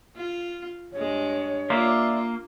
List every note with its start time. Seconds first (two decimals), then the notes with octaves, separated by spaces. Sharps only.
0.16 F4
0.93 G2 G#3 C#5
1.70 A#3 F4 D5 E5 C6